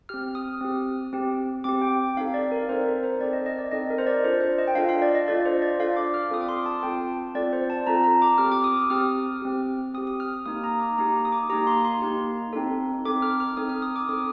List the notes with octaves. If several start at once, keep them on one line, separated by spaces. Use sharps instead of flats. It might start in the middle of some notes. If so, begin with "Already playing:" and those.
C4 G4 F6
D#6
C4 G4
C4 G4
C4 G4 D6
G5
C4 D#4 A4 F5
D5
A#4
C4 D#4 A4 C5
A#4
C5
C4 D#4 A4 D5
D#5
D#5
D5
C4 D#4 A4 D#5
A#4
C5
D5
D4 F4 A4 C5
C5
D#5
G5
D4 F4 A4 F5
F5
D5
D#5
D4 F4 A4 D5
D5
C5
D5
D4 F4 A4 F5
D6
F6
C4 F4 A4 D#6
D6
C6
A5
C4 F4 A4 G5
C4 F4 A4 D5
C5
A5
C4 F4 A4 A#5
A#5
D6
C4 G4 F6
D6
D#6
D#6
C4 G4 F6
C4 G4
C4 G4 D#6
D#6
F6
F6
A#3 D#4 G4 D#6
A#5
D6
A#3 D#4 G4 A#5
D#6
D6
A#3 D#4 G4 A#5
C6
C6
A#3 D#4 G4
C4 D#4 A4
C4 D#4 A4 D6
F6
F6
C4 D#4 A4 D#6
F6
D#6
D6
C4 D#4 A4 D#6